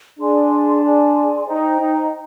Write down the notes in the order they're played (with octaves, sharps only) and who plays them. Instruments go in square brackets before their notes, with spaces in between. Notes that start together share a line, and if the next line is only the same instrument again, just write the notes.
[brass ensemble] D4 [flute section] G#4 D5 G#5 C6
[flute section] G#4 D5 G#5 C6
[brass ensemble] D#4 [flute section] C5 G5 A#5
[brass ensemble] D#4